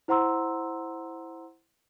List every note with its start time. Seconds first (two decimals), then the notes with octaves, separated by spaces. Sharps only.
0.08 E4 C5 F#5 A#5 C6 E6